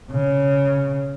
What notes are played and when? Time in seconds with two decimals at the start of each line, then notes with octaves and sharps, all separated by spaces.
0.12 C#3